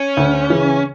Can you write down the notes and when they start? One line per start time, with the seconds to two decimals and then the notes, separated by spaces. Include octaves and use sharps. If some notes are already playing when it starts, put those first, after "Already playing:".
Already playing: C#4
0.17 D2
0.50 C#3 E3